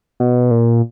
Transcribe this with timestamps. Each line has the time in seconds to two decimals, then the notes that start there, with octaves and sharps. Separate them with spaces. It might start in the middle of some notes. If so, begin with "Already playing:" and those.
0.20 B2
0.51 A#2